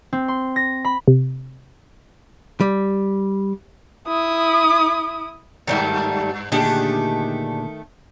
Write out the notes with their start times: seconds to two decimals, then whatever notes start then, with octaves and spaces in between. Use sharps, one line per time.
0.13 C4
0.28 C6
0.56 A#6
0.85 B5
1.08 C3
2.61 G3
4.08 E4 D#6
5.67 G2 D#3 G3 A3
6.52 A#2 D3 D#3 A3 D4 G4 G#4